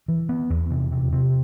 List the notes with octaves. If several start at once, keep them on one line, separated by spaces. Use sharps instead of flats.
E3
B3
E2
C3
C3
C3